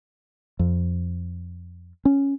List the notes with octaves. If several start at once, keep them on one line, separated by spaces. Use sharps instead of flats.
F2
C#4